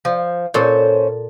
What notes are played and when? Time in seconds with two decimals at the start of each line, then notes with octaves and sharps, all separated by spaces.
0.05 F3
0.54 A#2 C#4 A4 C5